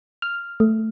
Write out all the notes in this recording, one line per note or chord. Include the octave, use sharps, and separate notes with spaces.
F6
A3